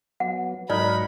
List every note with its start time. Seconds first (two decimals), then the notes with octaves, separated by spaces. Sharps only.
0.20 F#3 B3 F#5
0.70 G#2 F#3 D#4 A#4 D5 F#5 B5